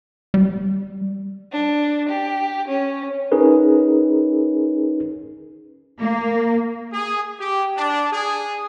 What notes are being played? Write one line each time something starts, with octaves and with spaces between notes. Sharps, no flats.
G3
D4
G4
C#4
C#4 D#4 G#4 A#4 B4
A#3
G#4
G4
D4
G#4